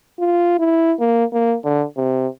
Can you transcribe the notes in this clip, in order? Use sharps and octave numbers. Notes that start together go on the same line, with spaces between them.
F4
E4
A#3
A#3
D3
C3